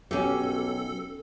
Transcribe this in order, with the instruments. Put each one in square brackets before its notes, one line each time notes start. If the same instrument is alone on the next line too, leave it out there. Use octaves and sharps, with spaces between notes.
[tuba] B1 [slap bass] F#3 [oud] C#4 G4 [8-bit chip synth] A4